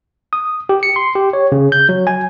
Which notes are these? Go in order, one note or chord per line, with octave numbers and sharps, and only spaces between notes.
D#6
G4
C#7
C6
G4
C#5
C#3
G6
F#3
G#5